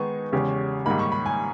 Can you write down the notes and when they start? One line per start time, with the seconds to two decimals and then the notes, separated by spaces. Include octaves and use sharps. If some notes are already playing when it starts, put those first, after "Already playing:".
Already playing: D#3 G#3 B3 D#4 G#4 C#6
0.32 E2 C#3 G#3 C#4 G4
0.86 G#2 D#3 G3 A#3 D#4 B5
0.99 C#6
1.12 B5
1.26 G#5